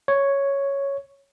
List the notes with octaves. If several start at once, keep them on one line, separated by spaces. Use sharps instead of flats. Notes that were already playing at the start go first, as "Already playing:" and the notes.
C#5